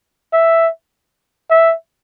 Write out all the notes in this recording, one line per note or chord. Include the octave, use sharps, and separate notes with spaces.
E5
E5